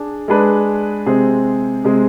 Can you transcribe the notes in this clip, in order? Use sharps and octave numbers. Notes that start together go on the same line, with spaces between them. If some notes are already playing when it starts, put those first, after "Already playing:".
Already playing: D4 G#4
G#3 D4 G#4 B4
C3 G#3 C4 G#4
C3 G#3 C4 G#4